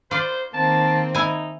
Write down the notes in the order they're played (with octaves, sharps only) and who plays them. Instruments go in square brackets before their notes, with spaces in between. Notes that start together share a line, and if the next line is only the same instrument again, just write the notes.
[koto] F4 D5 [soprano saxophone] C5
[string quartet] D#3 A#3 C4 [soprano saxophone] A5
[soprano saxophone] D#4 [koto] E4 G#5